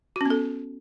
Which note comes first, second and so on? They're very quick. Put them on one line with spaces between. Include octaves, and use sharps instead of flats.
F#4 C#4 B3 A4